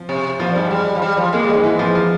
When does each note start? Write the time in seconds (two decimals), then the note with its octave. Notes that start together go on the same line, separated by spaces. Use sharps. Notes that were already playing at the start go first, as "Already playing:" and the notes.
Already playing: F3
0.09 C3
0.39 A#2 F3
0.55 G#2 G3
0.71 G3 G#3
0.95 F3
1.02 G3
1.17 F3
1.33 G#3 A#3
1.43 G3
1.49 G#2 G#3
1.63 E3
1.79 F3
1.95 F3